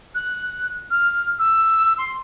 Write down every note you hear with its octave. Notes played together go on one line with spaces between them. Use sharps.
F#6
F6
E6
C6